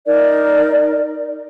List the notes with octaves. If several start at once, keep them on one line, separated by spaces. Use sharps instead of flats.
D#4 A#4 D5